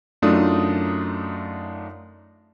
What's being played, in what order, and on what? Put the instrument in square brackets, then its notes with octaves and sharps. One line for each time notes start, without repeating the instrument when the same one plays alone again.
[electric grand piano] F#2 A3 D4 D#4 F4 D#6